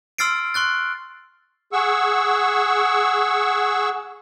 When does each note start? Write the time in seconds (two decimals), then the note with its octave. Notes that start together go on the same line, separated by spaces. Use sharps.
0.18 C6 E6 F6 A6 C7 D7
0.54 C6 C#6 F#6 A6
1.72 G#4 F#5 C#6 E6